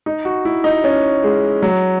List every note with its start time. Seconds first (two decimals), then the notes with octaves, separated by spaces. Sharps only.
0.06 D#4
0.25 F#4
0.45 E4
0.64 D#4
0.84 C#4
1.24 G#3
1.63 F#3